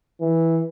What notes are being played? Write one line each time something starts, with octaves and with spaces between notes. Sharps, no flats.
E3